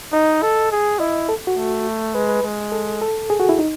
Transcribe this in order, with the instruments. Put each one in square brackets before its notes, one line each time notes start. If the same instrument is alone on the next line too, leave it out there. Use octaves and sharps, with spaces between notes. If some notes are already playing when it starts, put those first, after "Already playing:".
[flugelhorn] D#4 [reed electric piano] D#5
[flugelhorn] A4
G#4
[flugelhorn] E4 [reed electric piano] D#5
[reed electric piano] A4
F#4
[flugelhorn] A3
[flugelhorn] G#3 [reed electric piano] B4
[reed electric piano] B4
[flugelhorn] G#3
[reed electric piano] A4
A4
G#4
F#4
E4
D#4